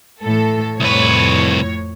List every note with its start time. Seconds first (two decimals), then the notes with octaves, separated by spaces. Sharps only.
0.22 A2 E3 A4
0.80 C2 F2 A2 B4 C#5